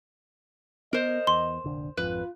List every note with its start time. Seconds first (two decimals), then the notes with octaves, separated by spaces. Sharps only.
0.93 B3 A#4 C5 D#5
1.27 E2 C6
1.64 F1 A#1 D3
1.97 G#1 F2 F4 B4